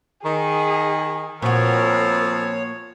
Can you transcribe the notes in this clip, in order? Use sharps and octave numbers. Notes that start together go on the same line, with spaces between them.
D#3 G#4
A#2 F3 B3 C4 F#4 A#4 C#5